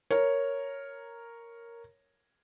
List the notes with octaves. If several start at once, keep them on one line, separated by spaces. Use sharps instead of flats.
A#4 C#5